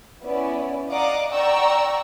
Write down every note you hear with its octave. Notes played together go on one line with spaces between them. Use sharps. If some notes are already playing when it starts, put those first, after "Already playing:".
B3 C#4 E4 D5
D5 D#5 F5 F#5 A#5 D6
D5 F#5 G5 A#5 C#6 E6